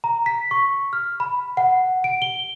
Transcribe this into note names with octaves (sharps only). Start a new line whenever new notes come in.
A#5
B6
C#6
F6
B5
F#5
D7
G7